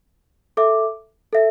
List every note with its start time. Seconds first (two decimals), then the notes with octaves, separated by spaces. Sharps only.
0.57 A4 E5 D6
1.33 A4 E5